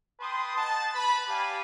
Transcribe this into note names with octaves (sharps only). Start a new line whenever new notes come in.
B4 G5 A5 C6 D#6
D#4 F#5 A5
B4 B5
G4 D5 F5 G#5 A5